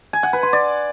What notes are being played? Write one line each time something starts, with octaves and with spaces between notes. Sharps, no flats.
G#5
F#5
B4
C6
D5